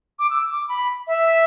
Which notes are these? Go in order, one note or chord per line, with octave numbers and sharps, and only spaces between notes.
D6
E6
D6
B5
E5